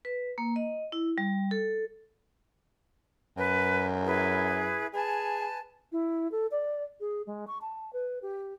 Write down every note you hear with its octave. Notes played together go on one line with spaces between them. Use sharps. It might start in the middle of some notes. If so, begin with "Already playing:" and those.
B4
A#3
D#5
E4
G3
A4
F#2 B4
E4 G#4 B4
G#4 B4 G#5 A5
E4
A4
D5
G#4
G#3
C#6
A5
B4
G4